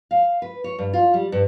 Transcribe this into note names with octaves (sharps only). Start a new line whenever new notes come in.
F5
B4
C#5
G2
F4
G3
G2